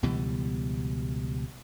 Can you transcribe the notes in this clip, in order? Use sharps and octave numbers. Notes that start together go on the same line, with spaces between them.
C#2 B2 E3 G3